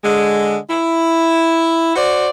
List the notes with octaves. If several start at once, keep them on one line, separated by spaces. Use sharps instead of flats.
D3 G#3
E4
F#4 C5 D5